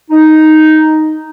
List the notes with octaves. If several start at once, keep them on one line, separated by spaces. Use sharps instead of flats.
D#4